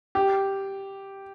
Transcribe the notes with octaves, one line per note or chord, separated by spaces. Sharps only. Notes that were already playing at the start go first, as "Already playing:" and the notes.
G4